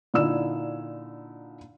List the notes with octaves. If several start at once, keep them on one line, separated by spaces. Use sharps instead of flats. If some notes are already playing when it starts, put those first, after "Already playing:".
A#2 D3 D#4 E4 E6 E7